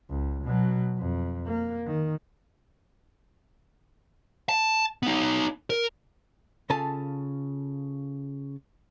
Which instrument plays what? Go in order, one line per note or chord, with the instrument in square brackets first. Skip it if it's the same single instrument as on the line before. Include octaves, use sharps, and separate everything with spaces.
[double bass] C#2
B2 F#3
F2
A#3
D#3
[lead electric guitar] A5
B3 D#4
A#4
[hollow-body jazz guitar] C#3 F4 A4 G#5 A5